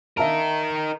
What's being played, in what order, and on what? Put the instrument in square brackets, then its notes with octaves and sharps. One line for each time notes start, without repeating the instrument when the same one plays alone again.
[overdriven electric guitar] D#4 A#4 [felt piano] E5 F5 A5